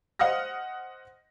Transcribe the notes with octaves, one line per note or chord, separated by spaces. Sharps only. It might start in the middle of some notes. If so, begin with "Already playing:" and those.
C5 D#5 F#5 D#6 F6 A#6